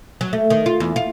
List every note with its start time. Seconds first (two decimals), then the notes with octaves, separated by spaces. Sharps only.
0.21 F#3
0.33 A3
0.50 D#3
0.66 F4
0.80 E2
0.96 F4